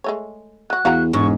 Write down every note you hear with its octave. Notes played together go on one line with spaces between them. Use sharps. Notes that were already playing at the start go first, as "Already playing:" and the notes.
G#3 A3 C#5
F#3 F#4 F#6
E2 F#4 F5 F#5 A#5
E1 G#2 C#6